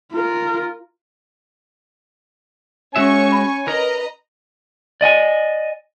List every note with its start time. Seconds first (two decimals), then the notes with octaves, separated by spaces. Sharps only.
0.13 F4 A#4
2.96 G#3 C#4 F#4 E5 G#5 C#6
3.32 B5
3.68 A#4 B4 D#5 A#5
5.01 D5 D#5 G5 G#5